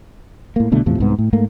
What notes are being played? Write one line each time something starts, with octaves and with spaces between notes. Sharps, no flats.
A2 A#3
C2 B2 D3 A3
E2 A2 C3 F3
C2 G#2 B3
A2
G#2 A3 A#3